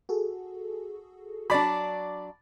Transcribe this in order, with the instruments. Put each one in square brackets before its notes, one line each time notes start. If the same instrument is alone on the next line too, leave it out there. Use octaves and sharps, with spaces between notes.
[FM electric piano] F#4 G#4 A4
[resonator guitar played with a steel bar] F#3 D4 [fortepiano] D5 B5